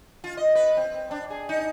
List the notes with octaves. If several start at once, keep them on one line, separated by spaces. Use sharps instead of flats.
F4
D#5
B4
C4
D4
G#4
D#4